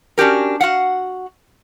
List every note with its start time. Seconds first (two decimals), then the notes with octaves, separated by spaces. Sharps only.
0.18 C#4 D4 F#4 G4 A#4
0.60 F#4 F5 F#5